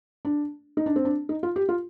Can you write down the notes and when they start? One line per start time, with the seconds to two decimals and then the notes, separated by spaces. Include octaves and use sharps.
0.25 D4
0.77 D#4
0.86 D4
0.96 C4
1.05 D4
1.29 D#4
1.43 F4
1.56 G4
1.69 F4